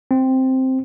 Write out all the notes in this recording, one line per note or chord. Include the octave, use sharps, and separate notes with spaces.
C4